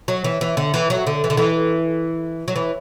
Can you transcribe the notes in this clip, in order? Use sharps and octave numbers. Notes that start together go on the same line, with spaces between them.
F#3
E3
E3
D3
E3
F#3
D3
E3
D3
E3
F#3
E3